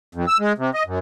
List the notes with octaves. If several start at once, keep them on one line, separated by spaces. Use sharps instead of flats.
F2
E6
G#3
C3
D#5
F#2